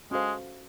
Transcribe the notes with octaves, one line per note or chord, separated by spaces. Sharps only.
G#3 C#4 F#4 A4 C5 F5